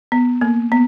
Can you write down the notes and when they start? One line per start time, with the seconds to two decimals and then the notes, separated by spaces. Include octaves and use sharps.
0.12 B3
0.41 A#3
0.72 B3